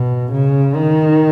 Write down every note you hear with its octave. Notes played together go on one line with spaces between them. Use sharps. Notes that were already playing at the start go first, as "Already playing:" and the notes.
Already playing: B2
C#3
D#3